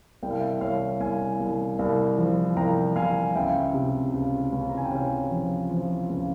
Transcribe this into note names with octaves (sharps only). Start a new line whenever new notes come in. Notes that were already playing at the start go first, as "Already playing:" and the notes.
C2 G5
F5
E5 G5
C2 C#5 F5
C2 F5 G#5
C2
C2
F3
C2 G5 A#5
C2 F5 G#5
C#2 E5 G5
C3
C#2
C#2
A#5
G#5
G5
C3 C#5 F5
F3
F3
C#2